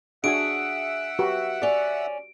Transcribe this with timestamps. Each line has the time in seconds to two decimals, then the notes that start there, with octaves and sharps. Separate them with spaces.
0.24 D4 F#4 G#4 E5 F#5 G#5 D7
1.19 F#4 G4 B4
1.62 C#4 D5